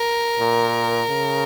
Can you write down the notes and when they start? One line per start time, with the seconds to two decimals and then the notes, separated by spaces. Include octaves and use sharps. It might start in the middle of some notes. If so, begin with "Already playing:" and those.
Already playing: A#4
0.40 A#2
1.10 C#3